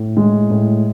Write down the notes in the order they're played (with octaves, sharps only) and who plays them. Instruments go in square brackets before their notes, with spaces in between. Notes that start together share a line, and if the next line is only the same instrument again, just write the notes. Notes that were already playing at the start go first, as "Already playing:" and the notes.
Already playing: [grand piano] A2
G#3
A2